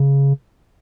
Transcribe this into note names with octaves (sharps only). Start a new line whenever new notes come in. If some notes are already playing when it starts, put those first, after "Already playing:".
Already playing: C#3